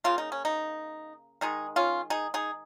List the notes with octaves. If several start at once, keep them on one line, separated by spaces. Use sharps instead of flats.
C#3 A#3 F4
D#4
C#4
D#4
D#3 G#3 D#4 G#4
C#4 F4
D#4 G#4
D#4 G#4